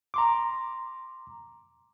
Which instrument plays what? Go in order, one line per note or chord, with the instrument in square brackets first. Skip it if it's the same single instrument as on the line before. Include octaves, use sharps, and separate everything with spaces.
[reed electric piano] A#5 C6 D6